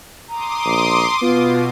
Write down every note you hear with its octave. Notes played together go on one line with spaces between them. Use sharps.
A#5 C6 D6 D#6
A#1
B2 B3 F4